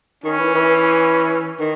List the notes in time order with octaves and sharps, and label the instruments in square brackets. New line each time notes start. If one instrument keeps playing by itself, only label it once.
[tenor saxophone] D#3 [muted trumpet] C#4
[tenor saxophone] E3
E3
D#3